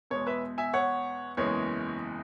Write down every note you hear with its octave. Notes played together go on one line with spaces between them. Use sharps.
E2 B2 G#3 C#5
B4 E5
E5 G#5
C#5 F#5
F#1 E2 E3 G#3 C#5